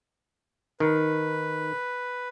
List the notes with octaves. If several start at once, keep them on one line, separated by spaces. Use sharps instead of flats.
D#3 B4